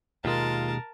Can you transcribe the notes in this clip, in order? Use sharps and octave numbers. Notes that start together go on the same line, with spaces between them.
D#2 B2 G#3 F4 A#4 A5